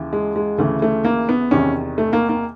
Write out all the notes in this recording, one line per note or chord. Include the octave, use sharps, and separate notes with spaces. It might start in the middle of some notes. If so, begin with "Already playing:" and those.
Already playing: D#2 C#3 E3
G#3
G#3
D2 C#3 E3 A3
A3
A#3
B3
E2 C3 D#3 C#4
A3
A#3
A#3